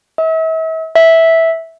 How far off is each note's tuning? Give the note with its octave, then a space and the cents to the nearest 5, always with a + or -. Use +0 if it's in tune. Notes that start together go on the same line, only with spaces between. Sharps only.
E5 -40
E5 -10